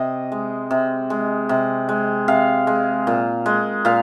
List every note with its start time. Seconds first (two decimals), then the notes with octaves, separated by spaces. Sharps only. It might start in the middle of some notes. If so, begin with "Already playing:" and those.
Already playing: C3 D#5
0.32 G#3
0.71 C3
1.10 G#3
1.49 C3
1.89 G#3
2.28 C3 F5
2.67 G#3
3.07 A#2
3.46 G#3
3.85 A#2 F5